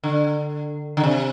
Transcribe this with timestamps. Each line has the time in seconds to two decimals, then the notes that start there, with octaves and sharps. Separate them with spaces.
0.04 D3
0.97 D3
1.04 C3